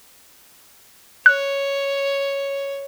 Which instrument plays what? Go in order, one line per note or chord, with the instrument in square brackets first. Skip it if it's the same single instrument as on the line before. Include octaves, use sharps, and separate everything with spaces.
[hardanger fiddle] C#5 [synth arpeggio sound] F#6